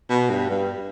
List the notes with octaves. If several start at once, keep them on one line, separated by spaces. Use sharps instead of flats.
B2
G2
G2